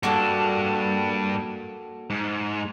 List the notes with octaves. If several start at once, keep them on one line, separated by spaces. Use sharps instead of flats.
G2 A#3 D4 F#4 A4
G#2